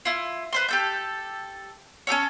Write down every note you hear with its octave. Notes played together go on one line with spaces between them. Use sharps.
E4 F4
B4 C5 C6
G4 A4 G6
C#4 G4 A4 C#5